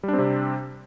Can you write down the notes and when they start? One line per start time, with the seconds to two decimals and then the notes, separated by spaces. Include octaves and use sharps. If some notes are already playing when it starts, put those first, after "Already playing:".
0.03 G3
0.08 D4
0.13 C4
0.18 C3